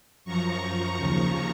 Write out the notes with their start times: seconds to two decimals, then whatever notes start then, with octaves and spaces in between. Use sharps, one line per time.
0.25 F#2 F3 A#5 C#6
0.97 D#2 C#3 F3 A#5 C#6